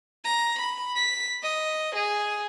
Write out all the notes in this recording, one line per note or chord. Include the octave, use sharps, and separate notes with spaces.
A#5
B5
B6
D#5
G#4